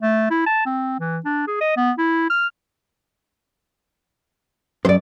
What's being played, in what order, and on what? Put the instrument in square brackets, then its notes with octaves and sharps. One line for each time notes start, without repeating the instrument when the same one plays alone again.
[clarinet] A3
E4
A5
C4
E3
D4
G#4
D#5
B3
E4
F6
[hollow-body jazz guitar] F#2 [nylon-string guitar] C5 D5